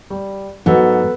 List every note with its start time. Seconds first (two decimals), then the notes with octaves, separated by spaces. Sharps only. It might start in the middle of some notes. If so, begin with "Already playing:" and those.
0.10 G3
0.66 G#2 F#3 B3 A4 B4